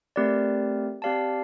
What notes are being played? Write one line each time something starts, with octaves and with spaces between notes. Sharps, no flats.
A3 C4 G4 A#4 D5
C4 G4 D5 F5 A5